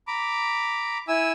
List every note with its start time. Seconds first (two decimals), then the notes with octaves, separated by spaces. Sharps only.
0.07 A#5 B5 D6
1.08 E4 G#5 E6